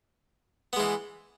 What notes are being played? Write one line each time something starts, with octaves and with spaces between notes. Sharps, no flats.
E3 G#3 B3